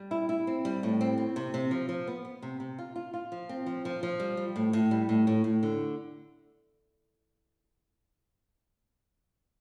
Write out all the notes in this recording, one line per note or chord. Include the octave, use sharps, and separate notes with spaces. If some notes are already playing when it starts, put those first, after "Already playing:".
Already playing: G3
E4
E4
C4
G3
A2
C4
C4
C3
C3
F3
F3
B3
B3
C3
C3
F4
F4
F4
F3
C4
F3
F3
F3
G3
G3
A2
A2
G3
A2
A2
A2
D3